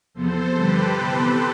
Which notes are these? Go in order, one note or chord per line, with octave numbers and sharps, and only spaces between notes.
E2 C3 F3 B3 A4 C5
G2 D3 F3 G4 B4
C3 E3 B3